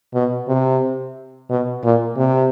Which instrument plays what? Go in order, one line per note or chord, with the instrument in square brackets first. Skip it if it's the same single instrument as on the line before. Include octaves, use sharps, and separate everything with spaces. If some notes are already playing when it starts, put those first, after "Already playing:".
[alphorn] B2
C3
B2
A#2
C3